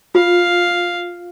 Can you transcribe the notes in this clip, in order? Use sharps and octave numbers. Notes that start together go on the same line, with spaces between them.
F4 F5